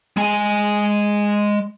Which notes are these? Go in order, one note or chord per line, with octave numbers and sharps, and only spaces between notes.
G#3 G#5